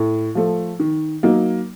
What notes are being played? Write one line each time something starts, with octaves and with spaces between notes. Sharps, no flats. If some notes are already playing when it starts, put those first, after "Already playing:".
Already playing: A2
F3 A3
D#3
F#3 A#3 D#4